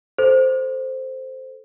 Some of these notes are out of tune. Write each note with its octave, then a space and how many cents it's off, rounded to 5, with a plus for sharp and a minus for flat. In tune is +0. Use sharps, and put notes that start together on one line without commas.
A4 +0 C5 -5